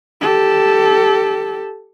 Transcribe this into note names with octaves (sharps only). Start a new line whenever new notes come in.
G4 A4